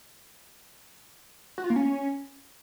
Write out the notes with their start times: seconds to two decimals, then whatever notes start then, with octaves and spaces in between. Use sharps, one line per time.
1.58 F#4
1.64 F4
1.70 A#3
1.76 C#4